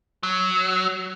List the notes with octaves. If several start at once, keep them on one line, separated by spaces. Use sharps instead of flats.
F#3